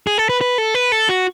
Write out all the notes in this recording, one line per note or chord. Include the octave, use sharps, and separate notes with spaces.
G#4
A4
B4
B4
A4
B4
A4
F#4